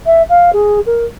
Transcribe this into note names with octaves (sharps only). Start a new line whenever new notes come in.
E5
F5
G#4
A#4